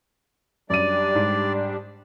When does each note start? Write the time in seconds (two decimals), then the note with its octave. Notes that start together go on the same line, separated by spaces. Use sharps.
0.70 F#2 G3 D4 D5 D#7
1.15 G#2